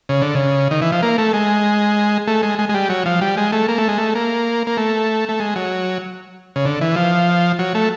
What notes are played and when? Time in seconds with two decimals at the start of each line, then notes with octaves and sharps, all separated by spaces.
0.09 C#3
0.22 D3
0.35 C#3
0.71 D#3
0.82 E3
0.92 F3
1.02 A#3
1.18 A3
1.33 G#3
2.27 A3
2.42 G#3
2.59 G#3
2.69 G#3
2.74 G3
2.89 F#3
3.06 F3
3.21 G3
3.37 G#3
3.52 A3
3.68 A#3
3.78 A3
3.88 G#3
3.98 A3
4.15 A#3
4.67 A#3
4.77 A3
5.29 A3
5.40 G#3
5.56 F#3
6.56 C#3
6.65 D3
6.81 E3
6.96 F3
7.59 F#3
7.75 A3